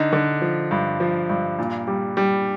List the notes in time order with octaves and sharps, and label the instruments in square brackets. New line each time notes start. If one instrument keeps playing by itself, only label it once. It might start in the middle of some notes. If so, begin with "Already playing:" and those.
Already playing: [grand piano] D3 D#4
D3
F3
G2
F3
G2
A#2
G3
G3